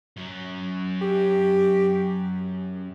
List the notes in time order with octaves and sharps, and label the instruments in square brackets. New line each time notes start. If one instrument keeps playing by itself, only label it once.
[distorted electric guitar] F#2 F#3
[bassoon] G4